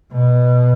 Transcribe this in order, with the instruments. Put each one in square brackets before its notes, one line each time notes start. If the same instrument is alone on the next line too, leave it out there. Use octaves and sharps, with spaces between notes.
[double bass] B2